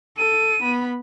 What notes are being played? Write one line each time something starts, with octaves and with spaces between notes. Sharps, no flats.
A4 D#7
B3 B5